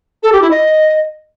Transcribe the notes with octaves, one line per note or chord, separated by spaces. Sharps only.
A4
G4
E4
D#5